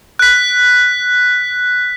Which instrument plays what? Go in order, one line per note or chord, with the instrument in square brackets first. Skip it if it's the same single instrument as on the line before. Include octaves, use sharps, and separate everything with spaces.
[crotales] F#6 B6